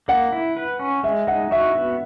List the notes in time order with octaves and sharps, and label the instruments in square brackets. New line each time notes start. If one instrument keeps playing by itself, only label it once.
[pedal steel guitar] A#3 [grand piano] F#5
[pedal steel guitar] E4
B4
C#4
[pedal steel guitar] G#3 [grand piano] E5
[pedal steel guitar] D#4 [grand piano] F#5
[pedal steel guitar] F#4 [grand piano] E5
[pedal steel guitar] B3